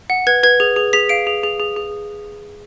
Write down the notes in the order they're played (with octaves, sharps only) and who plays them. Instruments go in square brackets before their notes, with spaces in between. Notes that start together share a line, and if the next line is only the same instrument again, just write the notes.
[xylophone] F#5
B4 G#6
B4 G#6
G#4
G#4
G#4 B6
F5 D7
G#4
G#4
G#4
G#4